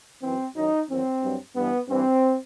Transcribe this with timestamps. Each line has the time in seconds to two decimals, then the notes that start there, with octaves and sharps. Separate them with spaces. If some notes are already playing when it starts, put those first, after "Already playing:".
0.22 F#2 E3 C4
0.56 F#2 D#3 F#3 D#4
0.89 E2 D#3 F#3 C4
1.22 G2 F#3
1.56 G2 E3 B3
1.89 G2 E3 C4